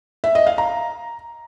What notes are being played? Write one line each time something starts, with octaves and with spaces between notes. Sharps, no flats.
E5
D#5
F5
A#5